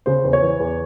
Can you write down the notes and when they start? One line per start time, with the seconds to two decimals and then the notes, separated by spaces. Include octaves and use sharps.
0.06 C#3 C5
0.24 E2
0.33 C#5
0.42 E3
0.60 E2